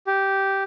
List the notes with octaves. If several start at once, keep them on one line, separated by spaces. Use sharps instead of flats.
G4